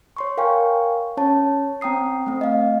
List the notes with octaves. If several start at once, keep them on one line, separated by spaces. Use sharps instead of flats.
C#5 C6 C#6
A#4 F5 G5 G#5 C#6
C#4 C#5 A5
C4 G5 A#5 D#6 C7
A3 C4
D#5 F5